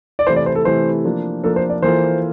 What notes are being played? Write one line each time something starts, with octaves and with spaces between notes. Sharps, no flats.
D5
C3 E3 A3 E4 C5
D5
C5
A4
C3 E3 A3 E4 C5
F3 A#3 D4
F3 A#3 D4 A4
C5
D5
E3 A#3 F4 A4 C5